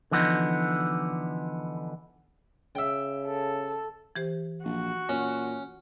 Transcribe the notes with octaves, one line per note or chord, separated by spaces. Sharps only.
D3 E3 F3 B3 D4 D#4
C#3 E5 G5
A4
E3 G4 C5
A#1 F#4
A#2 C#4